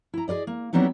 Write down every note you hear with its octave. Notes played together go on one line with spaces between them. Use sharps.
E4 A#5
G#4 A#4 D5 D#5
A#3
F#3 G3 B3 C4 D#4 E4